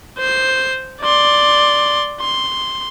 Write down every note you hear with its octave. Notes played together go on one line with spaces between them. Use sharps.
C5 C7
D5 C6
C6